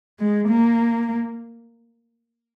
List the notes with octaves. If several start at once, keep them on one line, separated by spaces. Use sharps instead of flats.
G#3
A#3